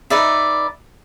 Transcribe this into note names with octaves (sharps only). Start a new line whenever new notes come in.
D#4 B4 D5 E5